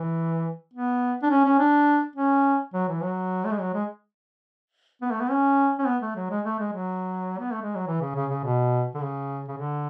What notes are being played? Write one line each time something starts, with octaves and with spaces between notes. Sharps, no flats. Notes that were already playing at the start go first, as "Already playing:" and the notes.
Already playing: E3
B3
D4
C#4
C#4
D4
C#4
F#3
E3
F#3
A3
G#3
F#3
G#3
B3
A3
B3
C#4
C#4
B3
A3
F#3
G#3
A3
G#3
F#3
B3
A3
G#3
F#3
E3
C#3
C#3
C#3
B2
D3
C#3
C#3
D3